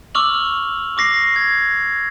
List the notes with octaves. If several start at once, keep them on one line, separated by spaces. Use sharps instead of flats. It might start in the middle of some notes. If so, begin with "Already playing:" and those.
C#6 D6 E6 F6 F7 F#7
C#6 D6 A#6 C7
G#6